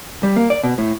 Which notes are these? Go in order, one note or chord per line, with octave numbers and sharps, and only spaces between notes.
G3
A#3
D5
B2
A2